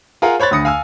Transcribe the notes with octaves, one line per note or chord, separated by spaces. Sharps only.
F4 G#4 A#4 F5 F#5 G#5
C5 C#5 B5 F#6 A6
D2 D3 B5 D#6 A#6 C#7
F5 G#5 E6 F6